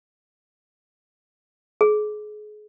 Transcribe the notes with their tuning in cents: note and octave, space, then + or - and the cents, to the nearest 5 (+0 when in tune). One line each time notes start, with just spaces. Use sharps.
G#4 +30